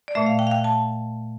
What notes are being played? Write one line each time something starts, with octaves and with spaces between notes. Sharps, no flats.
D5
A#2 A3 E5
F5
G5
F5
G5
A5